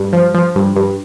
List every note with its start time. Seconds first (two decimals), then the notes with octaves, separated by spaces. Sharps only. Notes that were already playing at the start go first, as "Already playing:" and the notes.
Already playing: G2
0.13 F3
0.34 F3
0.55 G2
0.76 G2